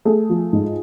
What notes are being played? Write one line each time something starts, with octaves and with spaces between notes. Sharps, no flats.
A3 G#4
F3
G#2